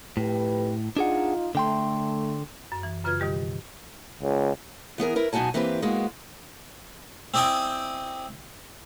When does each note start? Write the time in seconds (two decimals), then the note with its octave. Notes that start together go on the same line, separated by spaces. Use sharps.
0.17 F2 A2 G4 B4
0.97 D4 D#4 F4 G#4 F#5
1.55 D3 A3 G5 C6
2.72 F#2
2.83 E3
3.04 F#2 C#3 F4 B4 F6 G#6
3.20 B2 D#3 G3 G4
4.22 C#2
4.98 E3 B3 G#4 A#4
5.16 E4 A#4 B4
5.33 F#2 B2 D#4 F#4 G#5 A5
5.54 E3 A#3 C4 G4 G#4 B4
5.82 G#3 A#3 B3 F#4
7.34 C4 E4 D5 D#5 G5 G#5